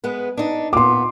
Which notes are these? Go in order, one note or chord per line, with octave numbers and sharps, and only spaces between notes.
G#3 B3 B4
D4 D#4
A#2 B3 C6 D6